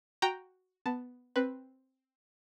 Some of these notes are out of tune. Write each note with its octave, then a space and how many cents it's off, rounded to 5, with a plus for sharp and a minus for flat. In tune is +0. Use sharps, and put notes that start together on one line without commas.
F#4 +0 G5 +0 A#5 +0
B3 +5 A5 +5
C4 +5 B4 +0